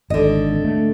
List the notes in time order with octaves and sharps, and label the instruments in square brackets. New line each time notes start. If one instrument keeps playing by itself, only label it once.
[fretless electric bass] G#1 [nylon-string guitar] D3 D#5
[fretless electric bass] A3